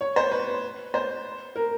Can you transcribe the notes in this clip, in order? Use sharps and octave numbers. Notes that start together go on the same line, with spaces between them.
C#5
C5
B4
C5
A#4